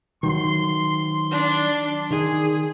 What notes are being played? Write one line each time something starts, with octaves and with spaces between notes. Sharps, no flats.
D#3 F#3 C6
D4
D#3 G#4